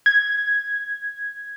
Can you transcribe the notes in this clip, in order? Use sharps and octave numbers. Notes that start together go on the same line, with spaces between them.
G#6